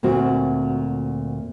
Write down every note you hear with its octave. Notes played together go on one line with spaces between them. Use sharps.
D2 A#2 C4 F#4